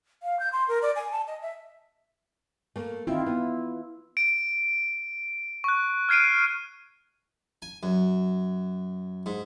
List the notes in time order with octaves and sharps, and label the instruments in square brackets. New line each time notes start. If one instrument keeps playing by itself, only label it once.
[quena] F5
G6
C6
A#4
D5
G#5
A5
D#5
E5
[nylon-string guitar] A3 A#3
[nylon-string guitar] D#3 C4 [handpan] E4 F4
[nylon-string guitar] B3
[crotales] D7
C#6 F#6
F6 G#6 C7 D7 D#7
[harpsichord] G#5
F#2
G#2